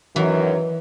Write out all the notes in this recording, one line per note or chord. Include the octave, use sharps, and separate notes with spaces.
F#2 D#3 E3 F#3